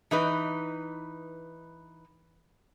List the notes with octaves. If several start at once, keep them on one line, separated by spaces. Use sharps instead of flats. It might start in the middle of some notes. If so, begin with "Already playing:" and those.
E3 D#4 B4